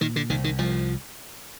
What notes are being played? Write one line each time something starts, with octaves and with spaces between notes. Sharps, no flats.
A#2 D#3
D3
C2 D#3
D#3
C2 F3